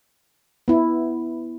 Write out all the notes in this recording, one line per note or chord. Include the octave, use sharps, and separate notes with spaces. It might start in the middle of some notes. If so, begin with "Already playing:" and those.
B3 E4